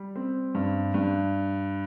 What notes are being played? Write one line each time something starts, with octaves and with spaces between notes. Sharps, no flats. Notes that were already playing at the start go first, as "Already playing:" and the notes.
Already playing: G3
C4
G2
G2